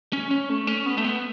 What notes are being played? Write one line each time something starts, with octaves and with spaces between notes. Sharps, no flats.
C#4
C#4
A3
C#4
B3
A3
B3